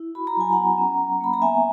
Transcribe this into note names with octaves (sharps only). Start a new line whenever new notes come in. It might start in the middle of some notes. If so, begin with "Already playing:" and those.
Already playing: E4
F#4 B5
A#5
F#3 G#5
B3 F#5 A#5
C#4
F#3
A#3 B5
A#5
B3 E5 G#5